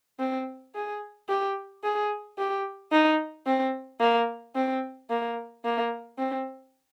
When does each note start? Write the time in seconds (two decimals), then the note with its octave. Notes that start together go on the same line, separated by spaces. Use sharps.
0.19 C4
0.75 G#4
1.29 G4
1.84 G#4
2.38 G4
2.92 D#4
3.46 C4
4.00 A#3
4.55 C4
5.10 A#3
5.65 A#3
6.18 C4